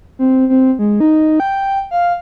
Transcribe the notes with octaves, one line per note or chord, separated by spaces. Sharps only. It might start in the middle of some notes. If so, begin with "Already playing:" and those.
C4
C4
G#3
D#4
G5
F5